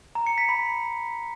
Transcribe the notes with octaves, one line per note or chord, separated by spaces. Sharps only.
A#5
C#7
B6
B5